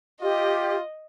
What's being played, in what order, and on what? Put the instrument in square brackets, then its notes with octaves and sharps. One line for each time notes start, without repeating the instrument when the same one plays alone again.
[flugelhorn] F4 [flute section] G4 [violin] D#5